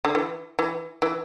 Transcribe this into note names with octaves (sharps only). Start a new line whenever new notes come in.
D3
E3
E3
E3